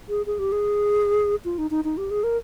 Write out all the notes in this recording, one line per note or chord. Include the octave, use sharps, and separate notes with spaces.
G#4
G#4
G4
G#4
F4
D#4
D#4
D#4
G4
G#4
A#4